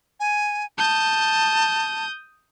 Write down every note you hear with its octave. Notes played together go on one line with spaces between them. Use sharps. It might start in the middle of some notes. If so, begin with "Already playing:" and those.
G#5
A5 D#6 G6